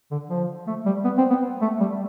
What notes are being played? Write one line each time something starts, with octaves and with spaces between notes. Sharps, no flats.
D3
F3
A3
G3
B3
C4
B3
A3
G3